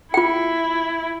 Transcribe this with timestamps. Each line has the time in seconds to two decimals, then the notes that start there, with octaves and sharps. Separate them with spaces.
0.14 E4 F4 G5